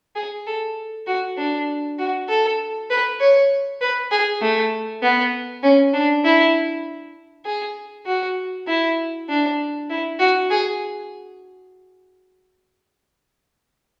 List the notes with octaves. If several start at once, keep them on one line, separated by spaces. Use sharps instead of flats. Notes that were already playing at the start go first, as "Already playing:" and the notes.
G#4
A4
F#4
D4
F#4
A4
B4
C#5
B4
G#4
A3
B3
C#4
D4
E4
G#4
F#4
E4
D4
E4
F#4
G#4